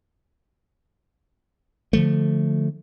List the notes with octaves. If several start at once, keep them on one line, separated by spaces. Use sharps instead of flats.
D3 F3 A3